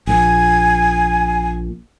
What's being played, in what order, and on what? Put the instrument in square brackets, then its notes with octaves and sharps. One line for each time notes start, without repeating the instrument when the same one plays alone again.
[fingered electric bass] A#1 A#2 [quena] G#5